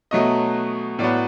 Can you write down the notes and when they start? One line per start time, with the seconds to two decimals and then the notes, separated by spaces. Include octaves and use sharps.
0.11 B2 F#3 A3 D#5
0.99 A2 F#3 B3 D5